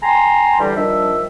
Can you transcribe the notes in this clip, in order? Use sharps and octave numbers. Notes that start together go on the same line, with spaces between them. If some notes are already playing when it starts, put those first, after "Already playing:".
G5 G#5 A#5 C6
D3 E3 G3
D#3 F3 G3 D4 E5